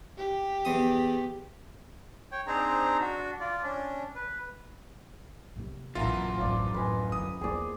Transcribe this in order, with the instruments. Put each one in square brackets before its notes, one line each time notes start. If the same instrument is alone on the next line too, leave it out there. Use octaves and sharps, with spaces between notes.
[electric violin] G4
[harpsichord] E2 D#6
[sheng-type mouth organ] C#5 G5
C4 D4 D#4 G#4 C5 A#5
D4 F#4
F4 D5
C#4 D4
B4
[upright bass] C3 A#3
[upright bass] A#1 A#2 [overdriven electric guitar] F#2 E3 [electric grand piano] F4 [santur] E5 F#5 A#5
[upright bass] D1 A1 [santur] F3 D5
[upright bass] D1 [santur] B4 D#5 G#5
[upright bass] D3 [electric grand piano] D#6
[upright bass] E2 A#3 [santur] G#4 C5 D5